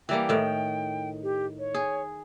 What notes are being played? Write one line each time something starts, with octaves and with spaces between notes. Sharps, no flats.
E3 G3 A#3 G5
A2 D#3
G4
C#5
G#4